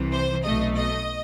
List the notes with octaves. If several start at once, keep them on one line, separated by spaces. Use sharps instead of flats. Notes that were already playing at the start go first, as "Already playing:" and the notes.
Already playing: C2 C3 E3
C5
B1 B2 A3 D#5
D#5